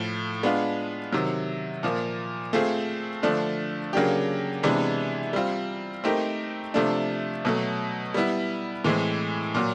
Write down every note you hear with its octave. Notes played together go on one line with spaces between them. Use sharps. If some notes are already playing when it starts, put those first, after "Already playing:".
Already playing: A2 F3 A3
G#3 B3 D4 F4
C3 D#3 F#3
A#2 F3 A#3
A3 C4 F4 G#4
D3 F3 A3 D4
C#3 F#3 A#3 D4 G4
C3 E3 G#3 B3 D4
G3 C4 F4
A3 C4 D#4 G4 A#4
C3 F3 A3 D4
B2 F#3 A3
G3 B3 E4
A2 E3 G#3 C4
A#2 F#3